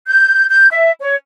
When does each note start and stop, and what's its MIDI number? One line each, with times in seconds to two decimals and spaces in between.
0.07 0.46 91
0.50 0.67 91
0.71 0.91 76
1.01 1.15 73